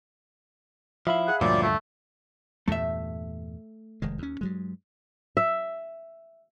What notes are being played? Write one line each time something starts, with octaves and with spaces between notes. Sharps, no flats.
F3 E4 E5 F5 B5
G#4 F#5
D2 G2 A#2 F3 F#3 D5
A3
E2 G2 A#2 A3 E5
F1 D#3 G#3
D#2 C#4
G2 F#3 G#3
E5